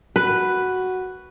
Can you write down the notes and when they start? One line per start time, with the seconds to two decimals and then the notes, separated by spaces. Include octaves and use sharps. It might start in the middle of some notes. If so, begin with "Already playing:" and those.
0.16 F#4 B4